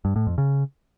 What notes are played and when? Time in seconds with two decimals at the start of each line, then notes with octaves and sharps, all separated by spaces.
0.05 G2
0.16 A2
0.27 F2
0.38 C#3